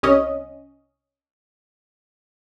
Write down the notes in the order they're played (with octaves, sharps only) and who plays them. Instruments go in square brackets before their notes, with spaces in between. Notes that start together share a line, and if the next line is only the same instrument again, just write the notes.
[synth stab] C2 C#4 D#5